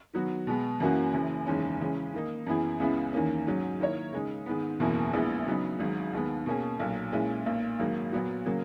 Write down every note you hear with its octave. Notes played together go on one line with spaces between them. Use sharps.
D#3 F#3 B3 F#4
B2 G#3 B3
F#2 E3 A#3 C#4 F#4
F#1 F#2 E3
F#1 E2 D#3 G#3 C#4
C#3 E3 G#3 C#4
D#3 A#3 D#4
F#2 E3 B3 E4 G#4
C#2 C#3 G#3 B3 E4
E2 D#3 A#3 C#4
G#2 F#3 C#4
D#3 A#3 E4 A#4 C#5
C#3 G#3 D#4
G#2 D#3 G#3 B3
F#1 E2 B2 A#3 E4
A#1 A#2 G#3 B3 E4
C#3 F#3 B3 D#4
G#1 G#2 F#3
D#2 D#3 G#3 B3
B2 A#3 C#4 G#4
B1 A#2 F#3
A#2 G#3 C#4 E4
B1 A#2 A#3
G#1 G#2 F#3 A#3
A#2 F#3 B3 F#4
C#3 F#3 A#3